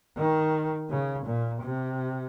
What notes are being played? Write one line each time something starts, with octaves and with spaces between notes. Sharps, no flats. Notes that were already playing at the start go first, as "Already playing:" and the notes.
D#3
C#3
A#2
C3